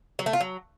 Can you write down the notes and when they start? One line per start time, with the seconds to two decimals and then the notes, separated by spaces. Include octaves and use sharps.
0.19 F#3
0.26 A3
0.33 F4
0.40 F#3